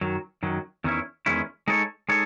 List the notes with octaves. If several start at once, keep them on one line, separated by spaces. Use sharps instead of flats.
F#2 D#3 F#3
F#2 D#3 F#3
E2 D#3 G#3 C#4 E4
E2 D#3 G#3 C#4 E4
G#3 D#4 A4 C#5
G#3 D#4 A4 C#5